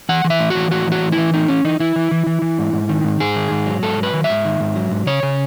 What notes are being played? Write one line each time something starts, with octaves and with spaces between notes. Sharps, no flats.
E3 F#5
E3
E5
A2
F#4
E3
A2 F#4
E3 F#4
A2
E4
E3
A2 D#4
E3 C#4
E3 D#4
E3 E4
E3
E3
E3
E3
G#2
G#2
D#3
G#2
G#2 G#4
D#3
G#2
F#3
G#2 A4
F#3
B4
D#3
E5
G#2
D#3
G#2
F#3
G#2
C#3 C#5
C#3